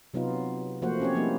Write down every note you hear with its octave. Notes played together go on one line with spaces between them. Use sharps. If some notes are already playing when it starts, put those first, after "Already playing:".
C3 F#3 B3 D#4 F4
F3 A3 A#3 F#4 C5 F#5
C4 C#4 G4 C#5
F3 G3 A#3 D#4 E4